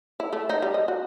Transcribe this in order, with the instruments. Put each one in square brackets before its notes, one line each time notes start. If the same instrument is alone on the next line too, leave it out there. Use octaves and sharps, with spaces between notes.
[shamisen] E4
A3
D#4
G3
D#5
F#4